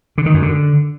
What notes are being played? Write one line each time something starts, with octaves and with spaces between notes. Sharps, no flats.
D3
D#3
F#2
D3